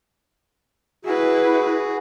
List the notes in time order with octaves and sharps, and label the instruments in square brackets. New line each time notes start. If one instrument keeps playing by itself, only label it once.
[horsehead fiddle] E4 B4 [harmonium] F#4 G#4